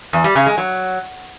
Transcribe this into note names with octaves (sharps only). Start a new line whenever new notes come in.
E2
G3
C#3
G#3
F#3